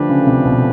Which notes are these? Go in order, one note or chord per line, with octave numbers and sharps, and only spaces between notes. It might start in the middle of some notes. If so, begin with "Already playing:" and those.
Already playing: D3 F3 A3 D4 G4 B4
C#3
C3
B2